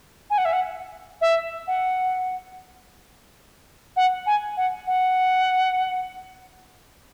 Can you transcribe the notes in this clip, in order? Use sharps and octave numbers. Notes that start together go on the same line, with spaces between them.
G#5
F#5
E5
F#5
E5
F#5
F#5
G#5
F#5
F#5